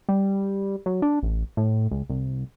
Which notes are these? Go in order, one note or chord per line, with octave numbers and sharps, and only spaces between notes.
G3
F#3
D4
A1
A2
C#2
C2